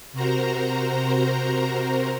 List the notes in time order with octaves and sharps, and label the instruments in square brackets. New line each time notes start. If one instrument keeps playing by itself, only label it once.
[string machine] C3 F#4 A#4 C5 A#5